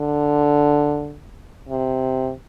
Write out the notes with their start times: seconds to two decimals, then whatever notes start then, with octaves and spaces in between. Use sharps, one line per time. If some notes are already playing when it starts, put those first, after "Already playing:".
Already playing: D3
1.69 C3